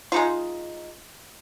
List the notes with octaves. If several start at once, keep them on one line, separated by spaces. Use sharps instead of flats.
G#3 D#4 F4